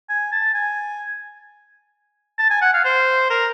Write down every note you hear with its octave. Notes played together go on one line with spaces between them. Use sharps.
G#5
A5
G#5
A5
G#5
F#5
F5
C5
A#4